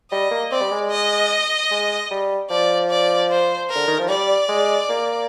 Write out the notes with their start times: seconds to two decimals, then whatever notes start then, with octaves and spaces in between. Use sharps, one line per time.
0.11 G3 D#5
0.31 A#3
0.51 C4 D5
0.61 G3
0.71 G#3
0.91 D#5
1.71 G#3
2.11 G3
2.50 F3 D5
2.90 D5
3.30 C5
3.70 A#4
3.75 D3
3.88 D#3
3.99 F3
4.09 G3 D5
4.49 G#3
4.90 A#3